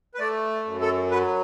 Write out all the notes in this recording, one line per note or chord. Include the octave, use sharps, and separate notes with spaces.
B4
A3 D5
F#2
A4
F#3 B4